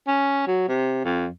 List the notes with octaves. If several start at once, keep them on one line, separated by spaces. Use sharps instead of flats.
C#4
F#3
C3
F2